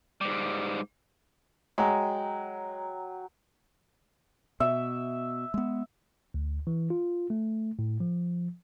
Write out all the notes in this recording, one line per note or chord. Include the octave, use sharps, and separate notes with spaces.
G#2 G3
F#3 G#3 G5
B2 E5
G#3 B3
D2
E3
F4
A3
A2
F3